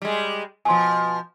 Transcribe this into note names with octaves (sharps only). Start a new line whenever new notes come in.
G3 G#3
B2 F3 G#5 C6